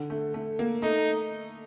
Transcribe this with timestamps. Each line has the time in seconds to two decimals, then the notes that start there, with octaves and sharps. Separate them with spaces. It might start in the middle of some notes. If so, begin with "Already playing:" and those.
Already playing: D3
0.10 A3
0.34 A3
0.59 A#3
0.82 A3 D#4